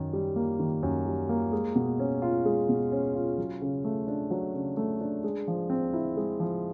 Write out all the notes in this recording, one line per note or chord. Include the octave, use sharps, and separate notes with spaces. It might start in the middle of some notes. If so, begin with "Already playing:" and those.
Already playing: F#2 D#3
G3
A#3
D#3
F#2
G3
A#3
G#3
B2
C#4
F4
G#3
B2
C#4
F4
F#3
C#3
A3
D4
F#3
C#3
A3
D4
G#3
F3
C4
E4
G#3
F3